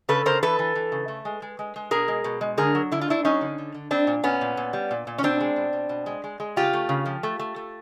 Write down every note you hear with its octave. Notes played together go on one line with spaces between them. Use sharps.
C#3 A4 B4
C#3 A#4 C5
E3 A4 B4
E3
E3
C#3
A3
G#3
G#3
G#3
G#3
B2 G#4 A#4
G#3
B2
G#3
D3 G#4 A#4
F#3
D3 E4
F4
A3 D4 E4
F#3 C#4 D#4
D3
D3
D3
G3 C4 D4
A#2
A#2 B3 C#4
A#2
A#2
G3
A#2
A#2
C#4
B2 C4 D4
G#3
B2
B2
B2
G#3
G#3
G#3
C#3 F4 G4
A3
C#3
F3
A3
A3
A3